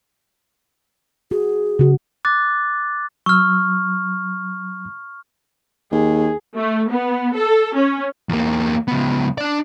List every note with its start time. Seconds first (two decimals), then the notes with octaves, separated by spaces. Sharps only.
1.31 F#4 G#4
1.79 C#3 F#4
2.25 D6 F#6 A6
3.26 F#3 C#6 E6 F6
5.92 D#2 G#4
6.56 A3
6.90 B3
7.36 A4
7.76 C#4
8.29 E2 A#3
8.88 C#2 B3
9.38 D4 D5